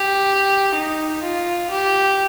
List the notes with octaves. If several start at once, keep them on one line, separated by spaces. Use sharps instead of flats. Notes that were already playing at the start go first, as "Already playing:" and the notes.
Already playing: G4
D#4
F4
G4